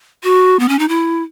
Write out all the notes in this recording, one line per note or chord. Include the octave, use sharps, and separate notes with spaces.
F#4
B3
C#4
D#4
E4